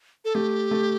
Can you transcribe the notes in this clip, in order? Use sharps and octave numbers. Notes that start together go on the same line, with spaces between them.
A4
A3 G4
A3